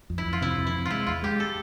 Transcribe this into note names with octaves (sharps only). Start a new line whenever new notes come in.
F2
E4
F2
F4
C3 E4
F2
E4
C3
F4
G#3 E4
E2 F4
G#3 G4
A4